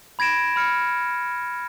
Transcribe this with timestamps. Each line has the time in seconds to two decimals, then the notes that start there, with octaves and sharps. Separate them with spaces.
0.19 B5 G#6 A#6 D7 E7
0.56 B5 F6 C#7